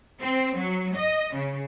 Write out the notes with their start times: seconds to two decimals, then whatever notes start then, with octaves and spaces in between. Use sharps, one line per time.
0.22 C4
0.58 F#3
0.98 D#5
1.36 C#3